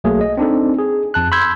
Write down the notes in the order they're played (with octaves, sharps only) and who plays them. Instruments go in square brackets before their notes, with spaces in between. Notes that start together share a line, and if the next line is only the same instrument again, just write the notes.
[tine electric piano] B1 F#3 A3 A#3 G#4
D#5
C4 D4 D#4 A4
G#4
F2 A5 F#6
B5 C6 E6 G6 G#6